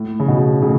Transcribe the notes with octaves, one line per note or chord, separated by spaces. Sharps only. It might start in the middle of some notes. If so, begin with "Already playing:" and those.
Already playing: A2
C#3
B2
A2 C#3